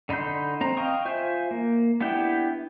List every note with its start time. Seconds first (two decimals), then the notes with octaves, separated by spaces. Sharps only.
0.09 D3 D#4 B5 C6 G6
0.61 C4 A#5
0.77 D#5 F5 G5 C#6 D#6
1.05 F4 C5 E5 G#5 G6
1.51 A#3
2.01 B3 D4 E4 G4 G5